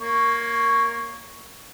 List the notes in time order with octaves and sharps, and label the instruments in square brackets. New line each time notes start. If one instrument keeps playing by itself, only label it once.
[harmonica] A#3 C#5 C#6